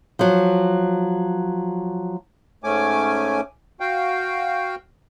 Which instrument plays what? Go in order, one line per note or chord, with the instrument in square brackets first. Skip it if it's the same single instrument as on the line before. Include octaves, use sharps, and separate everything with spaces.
[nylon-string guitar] F3 F#3
[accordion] G#2 A3 C#4 G#5 D6
F#4 F5 G5